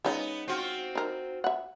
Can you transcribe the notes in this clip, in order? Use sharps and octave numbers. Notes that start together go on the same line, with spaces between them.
C#3 G#3 B3 D#4
C4 F4 F#4
D#4 A#4
E5 F#5